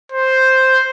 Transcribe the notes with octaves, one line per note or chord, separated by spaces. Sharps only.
C5